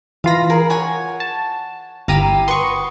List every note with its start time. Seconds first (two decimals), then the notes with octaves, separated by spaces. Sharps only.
0.24 E3 F4 F5 B5 A#6
0.50 G#4 A#4
0.70 C#5 F#5 G#5
1.20 A5
2.08 G1 E4 G4 F5 A#5 D#7
2.48 F#4 B4 C6 C#6 D#6